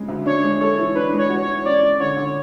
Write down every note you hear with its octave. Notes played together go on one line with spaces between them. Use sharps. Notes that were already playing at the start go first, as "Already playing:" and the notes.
Already playing: C#3 G#3
D2
D4 C#5
G#3
A4 C#5
E3
D4 B4
G#3
C#5
F#4
C#5
E3
C#4 D5
G#3
D3 C#5
D3